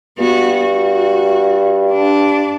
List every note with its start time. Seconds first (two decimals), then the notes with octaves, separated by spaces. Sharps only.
0.18 G2 B3 F#4
0.60 F#4
1.92 D4